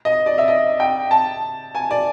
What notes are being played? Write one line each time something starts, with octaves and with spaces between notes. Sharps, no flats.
D#5
D5
E5
D#5
G5
A5
G#5
D5